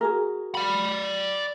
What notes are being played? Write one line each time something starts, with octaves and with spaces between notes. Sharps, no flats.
F#4 G#4 A#4
D5 B5